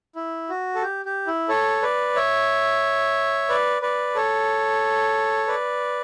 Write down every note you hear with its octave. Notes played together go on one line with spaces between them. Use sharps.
E4
F#4
A4
G4
G4
E4
A4 C#5
B4 D5
C#5 E5
B4 D5
B4 D5
A4 C#5
B4 D5